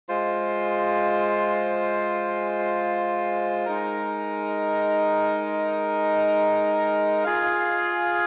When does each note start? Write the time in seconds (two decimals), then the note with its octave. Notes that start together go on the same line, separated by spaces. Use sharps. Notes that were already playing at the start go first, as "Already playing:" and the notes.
0.09 G#3 F4 C5
3.66 G#3 D#4 A#4
7.24 F4 G#4 F5